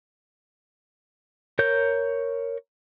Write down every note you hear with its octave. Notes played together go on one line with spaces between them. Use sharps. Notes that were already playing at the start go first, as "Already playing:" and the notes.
A#4 C#5 G6